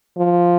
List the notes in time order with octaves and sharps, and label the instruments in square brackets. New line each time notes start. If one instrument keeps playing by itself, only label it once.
[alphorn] F3